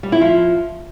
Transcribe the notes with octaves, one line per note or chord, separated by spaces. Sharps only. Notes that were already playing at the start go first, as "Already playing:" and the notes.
G3
E4
F3